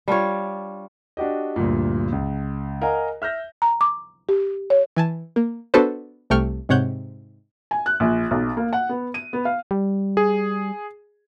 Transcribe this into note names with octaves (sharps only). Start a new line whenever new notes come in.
G3 D4 F4 C#5
D4 F#4 G4 D#5
D2 G2 A#2
C#2
A#4 D#5 F5 F#5 G#5 A#5
E5 F6 G6 A#6
A#5
D6
G4
C#5
E3 G#5 A5
A#3
B3 D4 F#4 A4 B4 C5
C2 C3 A3 G5 C#6 F6
G#2 C3 C#5 F#5 G6
G#5
F#6
A#1
B1
A#3
F#5
B3
D#7
B3
F5
G3
G#4